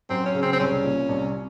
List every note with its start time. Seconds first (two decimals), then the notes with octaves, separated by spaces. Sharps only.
0.10 F#2 C4
0.26 C#4
0.34 C#3
0.42 C4
0.53 C4
0.59 C2 C#4
0.84 A#2
1.09 C2